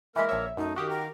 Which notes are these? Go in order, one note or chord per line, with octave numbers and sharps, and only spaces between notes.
E3 G#3 A#3 A#4 E5
A#1 C#5 E5
F#2 A3 D#4
D#3 F#4 G4 F5 D#6
A#4